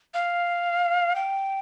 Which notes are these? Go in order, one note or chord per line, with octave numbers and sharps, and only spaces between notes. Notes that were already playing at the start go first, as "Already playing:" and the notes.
F5
G5